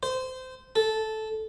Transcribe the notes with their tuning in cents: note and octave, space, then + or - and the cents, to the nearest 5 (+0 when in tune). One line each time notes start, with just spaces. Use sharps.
C5 -20
A4 -10